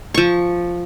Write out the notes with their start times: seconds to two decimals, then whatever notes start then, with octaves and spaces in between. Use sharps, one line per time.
0.14 F3 C#6